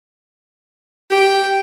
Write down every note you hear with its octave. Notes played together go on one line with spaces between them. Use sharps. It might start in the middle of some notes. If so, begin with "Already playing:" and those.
G4 G5